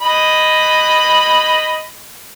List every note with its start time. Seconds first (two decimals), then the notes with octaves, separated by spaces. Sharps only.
0.01 D#5 B5